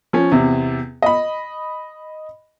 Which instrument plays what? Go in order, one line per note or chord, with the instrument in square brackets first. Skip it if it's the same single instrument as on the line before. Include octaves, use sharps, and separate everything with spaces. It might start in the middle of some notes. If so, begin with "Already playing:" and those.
[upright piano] F3 C#4
E2 C3
D#5 B5